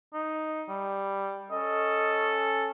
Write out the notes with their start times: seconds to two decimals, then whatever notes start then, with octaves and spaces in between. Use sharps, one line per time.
0.14 D#4
0.69 G3
1.51 C#4 A4 D#5